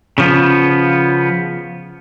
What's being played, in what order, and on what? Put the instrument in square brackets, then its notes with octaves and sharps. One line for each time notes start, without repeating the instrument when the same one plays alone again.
[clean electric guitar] C#3 F3 B3